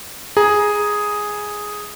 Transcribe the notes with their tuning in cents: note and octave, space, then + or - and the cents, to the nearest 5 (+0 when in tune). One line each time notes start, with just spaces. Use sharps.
G#4 +0 A#5 +15